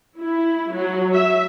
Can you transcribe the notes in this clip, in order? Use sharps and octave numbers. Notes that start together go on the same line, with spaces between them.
E4
F#3
E5